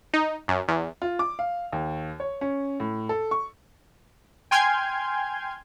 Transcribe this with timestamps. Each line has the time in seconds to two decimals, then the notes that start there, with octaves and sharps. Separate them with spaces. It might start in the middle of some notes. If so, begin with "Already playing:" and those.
0.14 D#4
0.48 F#2
0.68 E2
1.02 F4
1.19 D6
1.39 F5
1.72 D#2
2.20 C#5
2.41 C#4
2.80 A2
3.09 A4
3.31 C#6
4.51 G5 G#5 C6 F6 G6 G#6